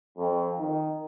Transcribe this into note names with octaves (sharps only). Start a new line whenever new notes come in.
F2
D#3